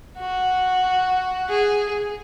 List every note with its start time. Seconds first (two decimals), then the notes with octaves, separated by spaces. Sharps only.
0.18 F#4
1.49 G#4